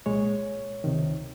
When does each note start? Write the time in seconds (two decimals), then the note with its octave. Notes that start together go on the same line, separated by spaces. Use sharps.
0.06 C2 A#2 G#3 C#5
0.84 C#2 C3 D#3